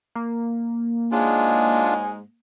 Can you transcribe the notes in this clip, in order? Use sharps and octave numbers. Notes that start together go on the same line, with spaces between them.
A#3
G#2 F#3 G#3 D4 F4 G#5